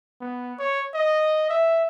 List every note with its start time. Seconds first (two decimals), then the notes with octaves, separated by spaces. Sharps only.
0.21 B3
0.59 C#5
0.94 D#5
1.50 E5